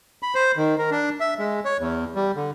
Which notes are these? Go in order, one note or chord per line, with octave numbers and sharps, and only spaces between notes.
B5
C5
D#3
A#4
D4
E5
G#3
C#5
E2
G3
D3